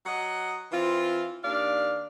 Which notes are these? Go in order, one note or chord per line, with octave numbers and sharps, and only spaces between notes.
F#3 D#5 F#5
E3 C4 F4
D#2 D4 D5 F5